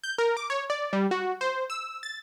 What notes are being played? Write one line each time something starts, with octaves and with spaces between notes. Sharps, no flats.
G6
A#4
D6
C#5
D5
G3
F#4
C5
E6
A6